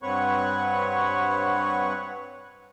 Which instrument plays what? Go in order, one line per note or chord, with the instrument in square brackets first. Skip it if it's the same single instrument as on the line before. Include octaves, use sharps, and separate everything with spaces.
[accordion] G2 C4 B4 C#5 F#5 C#6